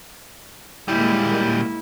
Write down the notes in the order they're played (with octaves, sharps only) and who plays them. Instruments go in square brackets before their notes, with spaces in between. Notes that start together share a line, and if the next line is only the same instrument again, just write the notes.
[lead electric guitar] A#2 G3 [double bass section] G#3 A#3 [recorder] E4